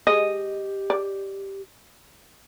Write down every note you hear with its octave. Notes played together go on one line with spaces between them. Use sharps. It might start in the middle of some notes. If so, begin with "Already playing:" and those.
G#3 G4 D#5
D5